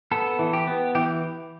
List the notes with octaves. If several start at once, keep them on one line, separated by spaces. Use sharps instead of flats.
B3 A4
E3
G4
B3
E3 G4